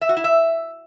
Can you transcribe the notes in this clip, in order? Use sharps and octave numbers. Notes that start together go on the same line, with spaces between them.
E5
F#4
E4
E5